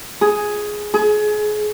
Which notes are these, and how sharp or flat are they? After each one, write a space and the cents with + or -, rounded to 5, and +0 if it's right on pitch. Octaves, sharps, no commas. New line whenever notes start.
G#4 +5
G#4 +30